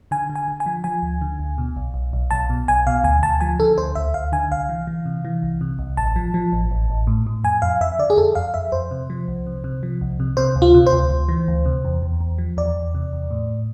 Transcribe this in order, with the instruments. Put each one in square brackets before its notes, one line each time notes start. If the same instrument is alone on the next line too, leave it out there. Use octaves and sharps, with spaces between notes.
[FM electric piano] D3 G#5
D3
G#5
D3
G#5
F3
F3 G#5
D2
D3
D2
B2
B1
B1
B1
B1 A5
B2
B1 G#5
B2 F5
D2 G#5
D2 A5
F3 G#5
D3 A4
D2 C5
D2 E5
D2 F5
D3 G#5
C2 F5
E3
E3
C3
E3
C2
C3
C2
A1 A5
F3
F3
A1
A1
A1
A2
A2
F2 G#5
F2 F5
F2 E5
D3 D5
G#4
F2 A4
F2 F5
F2 E5
F2 C5
C3
F3
C2
C3
C3
F3
C2
C3
C3 C5
D2
F4
C3
C5
D2
D2
E3
D2
C3
E2
E2
E2
F3
E2 D5
E2
C3
E2
A2